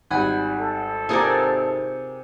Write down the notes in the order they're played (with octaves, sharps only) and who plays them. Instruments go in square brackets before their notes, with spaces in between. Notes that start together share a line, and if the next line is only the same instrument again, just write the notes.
[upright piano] G#1 G3 [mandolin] F#5 G#5 B5
[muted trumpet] A4
[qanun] C3 F4 [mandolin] G#4 A#4 D5